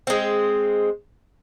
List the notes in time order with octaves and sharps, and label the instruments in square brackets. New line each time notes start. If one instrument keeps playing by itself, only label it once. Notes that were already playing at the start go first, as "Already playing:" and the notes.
[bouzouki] G#3 C4